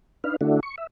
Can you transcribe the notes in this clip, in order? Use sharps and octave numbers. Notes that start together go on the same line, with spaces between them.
D4 D#4 B4 F5
D3 A3 D4 E4 F#4
C#6
E5